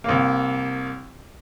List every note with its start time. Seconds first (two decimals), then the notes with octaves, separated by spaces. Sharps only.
0.04 C2 A#3